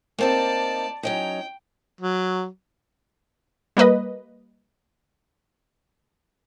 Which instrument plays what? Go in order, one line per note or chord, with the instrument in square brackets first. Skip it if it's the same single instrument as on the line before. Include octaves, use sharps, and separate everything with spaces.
[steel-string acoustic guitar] A#3 C4 D#4 [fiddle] D5 A5
[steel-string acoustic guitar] F#3 C#4 D#4 [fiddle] G5
[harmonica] F#3
[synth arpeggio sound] G3 A#3 B4 D#5